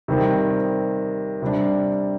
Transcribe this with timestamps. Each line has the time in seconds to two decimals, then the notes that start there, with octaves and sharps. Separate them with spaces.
0.08 C3 D#3 G3 C4
1.42 C3 G3 D4